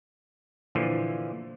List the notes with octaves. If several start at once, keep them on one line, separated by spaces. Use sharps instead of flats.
A#2 D3 E3 F3